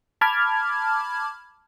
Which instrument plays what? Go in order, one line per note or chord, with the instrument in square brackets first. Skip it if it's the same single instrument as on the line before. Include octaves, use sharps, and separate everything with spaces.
[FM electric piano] A5 B5 D6 F6 G#6